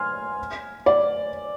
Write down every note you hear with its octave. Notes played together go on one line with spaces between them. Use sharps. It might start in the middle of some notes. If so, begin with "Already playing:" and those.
Already playing: G#5 C6 F6
D5